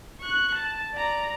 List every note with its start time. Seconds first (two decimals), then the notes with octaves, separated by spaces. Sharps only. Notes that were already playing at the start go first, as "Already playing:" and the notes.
0.20 C#6 F#6
0.55 A5
0.93 D5 A#5